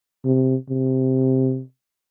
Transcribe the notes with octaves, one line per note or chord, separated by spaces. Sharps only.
C3
C3